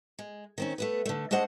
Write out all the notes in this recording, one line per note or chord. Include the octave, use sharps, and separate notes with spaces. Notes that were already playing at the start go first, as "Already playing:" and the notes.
G#3
D#3 C4 C#4
A3 B3 B4
D3 A3
A3 D4 G#4 C5 D#5 F#5